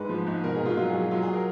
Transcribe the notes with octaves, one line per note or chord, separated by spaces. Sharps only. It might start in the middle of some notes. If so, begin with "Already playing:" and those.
Already playing: G#2 G#3 B4
F3
G#2
B2 A#4
G#4
B2
F4
F#3 F4
G#4
F#3
G#4
F#3 F4
G#4
A#4